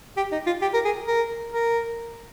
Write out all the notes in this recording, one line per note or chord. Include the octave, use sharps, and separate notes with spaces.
G4
D#4
F4
G4
A#4
G#4
A#4
A#4